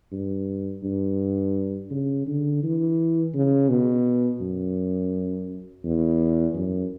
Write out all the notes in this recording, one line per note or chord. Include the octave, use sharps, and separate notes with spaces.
G2
G2
C#3
D3
E3
C#3
B2
F#2
E2
F#2